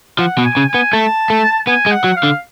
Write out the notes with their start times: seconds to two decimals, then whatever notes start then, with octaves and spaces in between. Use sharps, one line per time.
0.19 F3 F#5
0.38 B2
0.44 G#5
0.57 C#3
0.68 G#5
0.74 B3
0.93 A3 A5
1.30 A3
1.67 B3 G#5
1.86 G#3
1.91 F#5
2.04 F#3
2.16 F5
2.23 D3